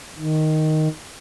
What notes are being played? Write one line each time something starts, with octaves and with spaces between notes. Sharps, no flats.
D#3